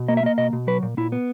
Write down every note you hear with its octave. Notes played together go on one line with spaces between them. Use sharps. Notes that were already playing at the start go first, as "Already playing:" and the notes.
Already playing: B2
A#3 D#5
E5
A#3 D#5
B2 D#5
B2
F#3 B4
A#2
A#2 E4
B3